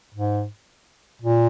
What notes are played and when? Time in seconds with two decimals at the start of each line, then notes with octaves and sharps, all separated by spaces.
0.14 G#2
1.22 A#2